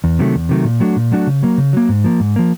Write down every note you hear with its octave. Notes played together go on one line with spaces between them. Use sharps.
E2
C3 D#3 F#3 A3
E2
C3 D#3 F#3 A3
A#2
F#3 A3 D4 F#4
A#2
F#3 A3 D4 F#4
C#3
F#3 A#3
C#3
F#3 A#3
G#2
F3 A#3
G#2
F3 A#3